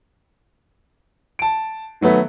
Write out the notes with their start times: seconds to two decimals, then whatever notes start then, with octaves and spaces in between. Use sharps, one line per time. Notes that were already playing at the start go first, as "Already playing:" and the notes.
1.39 A5 D7
2.01 D#3 F#3 A3 B3